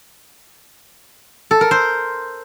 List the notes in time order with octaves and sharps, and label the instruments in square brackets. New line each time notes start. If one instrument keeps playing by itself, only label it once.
[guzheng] A4
A#4
C5